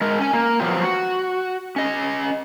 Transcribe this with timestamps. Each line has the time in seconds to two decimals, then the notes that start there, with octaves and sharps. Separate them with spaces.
0.01 G#3 A#4
0.19 C#4 G#5
0.33 A#3
0.60 F3 F#3 B3 C4 F4 G4
0.83 F#4
1.76 C#4 D#5